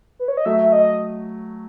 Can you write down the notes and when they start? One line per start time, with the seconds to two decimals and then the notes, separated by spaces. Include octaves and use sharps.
0.19 B4
0.28 C#5
0.37 D#5
0.45 F#3 A3 E5
0.61 E5
0.73 D#5